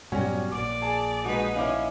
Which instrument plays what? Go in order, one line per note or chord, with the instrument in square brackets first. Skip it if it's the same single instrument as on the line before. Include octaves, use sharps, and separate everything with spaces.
[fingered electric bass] G2 A#2 B3 [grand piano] F#3 G3 C#4 [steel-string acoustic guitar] F#4
[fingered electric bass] A#1 A#2 [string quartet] D5 [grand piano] D6
[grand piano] G#4 A5
[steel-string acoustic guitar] G#3 F#4 [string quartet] D#4 B4
[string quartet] C#4 [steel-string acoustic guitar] D#4 E4 [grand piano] F5 D6